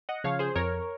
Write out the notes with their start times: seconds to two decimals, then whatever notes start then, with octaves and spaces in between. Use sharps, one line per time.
0.09 D#5 F#5
0.24 C#3 F3 C#5 F5
0.39 G#4 C5
0.55 F2 A#4 C#5